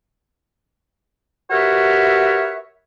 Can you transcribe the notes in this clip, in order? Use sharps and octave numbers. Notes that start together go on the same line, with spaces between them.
F#4 G4 A#4 B4 C#5 E5